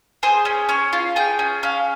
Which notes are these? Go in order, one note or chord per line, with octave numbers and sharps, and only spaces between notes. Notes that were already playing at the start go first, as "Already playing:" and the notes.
G#4 C5
C#4
C#4 C#5
F4
G#4 G5
C#4
C#4 F5